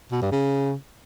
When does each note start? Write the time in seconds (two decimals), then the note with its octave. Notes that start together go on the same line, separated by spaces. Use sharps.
0.12 B2
0.22 G2
0.32 C#3